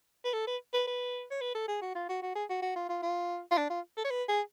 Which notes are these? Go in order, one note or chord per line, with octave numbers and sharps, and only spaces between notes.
B4
A4
B4
B4
B4
C#5
B4
A4
G#4
F#4
F4
F#4
F#4
G#4
F#4
F#4
F4
F4
F4
F4
D4
F4
A4
C#5
B4
G#4